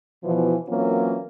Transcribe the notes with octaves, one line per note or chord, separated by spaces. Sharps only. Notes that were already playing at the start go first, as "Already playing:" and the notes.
B2 E3 F3
E3 F#3 A#3 C4 C#4 F4